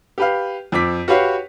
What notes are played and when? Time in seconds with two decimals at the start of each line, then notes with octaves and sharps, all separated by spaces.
0.18 G4 B4 F5
0.72 F2 C4 D6 B6
1.08 F#4 G4 B4 C#5 F5